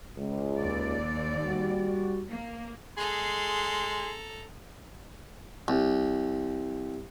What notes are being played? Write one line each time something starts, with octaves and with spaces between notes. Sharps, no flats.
C#2
D#2 D5
G3 F#4
A#3
G#3 G#4 A4 A#5 C6
C2